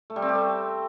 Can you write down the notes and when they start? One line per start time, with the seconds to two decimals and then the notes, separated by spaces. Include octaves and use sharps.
0.10 A3
0.16 G3
0.22 C4
0.29 G4
0.35 A3